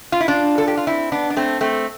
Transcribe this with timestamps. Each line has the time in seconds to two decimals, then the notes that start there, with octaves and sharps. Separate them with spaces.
0.12 F4
0.21 E4
0.28 D4 F4
0.58 A4
0.68 G4
0.77 F4
0.87 C4 E4
1.12 B3 D4
1.30 D4
1.36 A3 C4
1.61 A3 C4